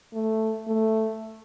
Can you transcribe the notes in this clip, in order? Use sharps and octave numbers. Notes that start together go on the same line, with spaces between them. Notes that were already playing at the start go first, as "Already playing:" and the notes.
A3
A3